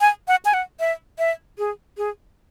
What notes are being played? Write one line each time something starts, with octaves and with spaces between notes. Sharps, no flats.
G#5
F#5
G#5
F#5
E5
E5
G#4
G#4